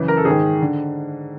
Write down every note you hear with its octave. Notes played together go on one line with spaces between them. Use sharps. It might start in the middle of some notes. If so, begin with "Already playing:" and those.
Already playing: F#2 C#3 E3
A#4
A4
G#2 D#3 G#4
D3